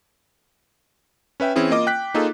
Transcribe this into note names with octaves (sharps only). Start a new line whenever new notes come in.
C#4 B4 E5 G5
E3 C4 C#4 E4 G#4
A#3 F4 D#5 D6
G5 F#6 B6
A#3 D#4 F4 G#4 A4